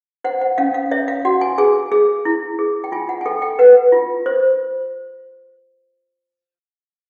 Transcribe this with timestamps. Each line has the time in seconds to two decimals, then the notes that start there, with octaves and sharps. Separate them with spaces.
0.24 C5 F#5
0.41 F#5
0.58 C#4 F5
0.74 F5
0.91 C#5 E5
1.08 F5
1.25 F#4 F#5
1.41 G#5
1.58 G#4 G#5
1.92 G#4
2.25 E4
2.59 G#4
2.84 G5
2.92 F4 G#5
3.09 F#5
3.21 G#5
3.26 A4 G5
3.42 G5
3.59 B4 F#5
3.92 F4
4.26 C5